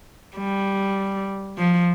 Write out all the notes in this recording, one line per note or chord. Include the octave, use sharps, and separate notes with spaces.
G3
F3